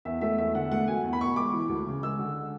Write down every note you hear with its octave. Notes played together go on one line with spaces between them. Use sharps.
E2 E5
A3 E5
E2 E5
D3 F#5
A3 F#5
F#3 G#5
E2
B5
B2 C#6
G#3 D6
E3
D2
C#3
G#3 E6
D3